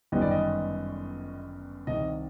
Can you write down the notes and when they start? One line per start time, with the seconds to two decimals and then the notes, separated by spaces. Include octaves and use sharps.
0.12 G1 F#2 D#3 G3 B3 D#5
0.22 D5
0.31 D#5
1.87 C2 C3 D#3 D#5